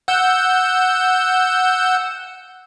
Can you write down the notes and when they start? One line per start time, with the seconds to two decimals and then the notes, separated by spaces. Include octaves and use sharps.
0.08 F#5 E6 G6